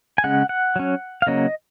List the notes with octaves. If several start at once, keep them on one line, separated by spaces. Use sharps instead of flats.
G#5
C#3 G#3 C#4 F#5
F#5
F#3 C#4
F5
C#3 F#3 A#3 C#4 D#5